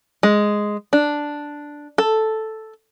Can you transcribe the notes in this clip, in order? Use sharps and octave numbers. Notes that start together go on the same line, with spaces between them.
G#3
D4
A4